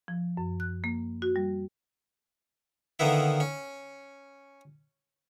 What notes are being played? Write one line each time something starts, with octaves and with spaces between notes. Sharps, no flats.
F3
F#2
F#6
A#3
F#4
G3
D3 D#3 A#3 B3 E4
C#4